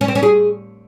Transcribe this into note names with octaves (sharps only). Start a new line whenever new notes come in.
C#4
C4
C#4
G#4